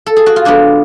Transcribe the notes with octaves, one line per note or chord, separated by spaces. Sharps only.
A4
G#4
F#4
F4
D3 G#3 B3 D4